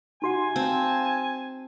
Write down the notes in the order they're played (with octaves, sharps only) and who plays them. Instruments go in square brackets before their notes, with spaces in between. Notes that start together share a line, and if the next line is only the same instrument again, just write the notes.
[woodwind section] C3 [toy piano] D#4 F#4 F#5 [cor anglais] G#5
[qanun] C4 [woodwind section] F5 A5